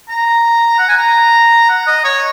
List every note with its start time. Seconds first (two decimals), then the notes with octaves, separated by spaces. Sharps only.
0.09 A#5
0.78 F#5
0.89 G#5
0.98 A#5
1.69 F#5
1.87 D#5
2.04 C#5